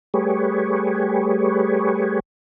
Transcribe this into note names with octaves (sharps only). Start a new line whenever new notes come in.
G3 A3 G4 G#4 B4 C#5